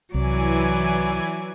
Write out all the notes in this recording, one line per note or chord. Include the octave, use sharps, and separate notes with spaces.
C2 E3 F#3 D5 G#5